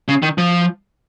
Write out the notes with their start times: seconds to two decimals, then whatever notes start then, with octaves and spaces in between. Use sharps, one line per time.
0.08 C#3
0.23 D#3
0.38 F3